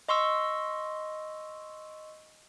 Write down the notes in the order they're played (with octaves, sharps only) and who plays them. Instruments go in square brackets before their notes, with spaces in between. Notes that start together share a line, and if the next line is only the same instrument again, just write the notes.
[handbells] D#5 C6 C#6 E6